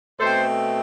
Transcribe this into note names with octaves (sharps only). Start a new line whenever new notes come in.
B2 A3 C4 A4 C5